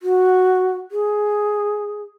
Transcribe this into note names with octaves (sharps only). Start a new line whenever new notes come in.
F#4
G#4